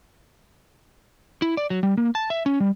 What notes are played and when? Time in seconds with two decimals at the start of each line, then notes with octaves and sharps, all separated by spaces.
1.42 E4
1.57 D5
1.70 F#3
1.83 G3
1.97 A#3
2.15 A5
2.30 E5
2.46 C#4
2.60 G3